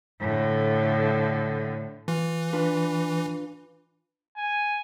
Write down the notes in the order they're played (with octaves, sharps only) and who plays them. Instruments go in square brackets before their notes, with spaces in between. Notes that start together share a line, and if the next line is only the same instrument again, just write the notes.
[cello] A2 D3
[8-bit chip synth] E3 [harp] F4
[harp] D4 F4 B4
[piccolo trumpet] G#5